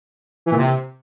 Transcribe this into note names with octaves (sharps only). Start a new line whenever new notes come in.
E3
A#2
C3